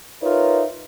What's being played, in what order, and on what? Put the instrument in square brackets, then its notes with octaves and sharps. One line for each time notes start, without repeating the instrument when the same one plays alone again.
[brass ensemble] D#4 F4 A#4 B4 C#5 E5